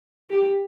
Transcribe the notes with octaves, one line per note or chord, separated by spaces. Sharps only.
G4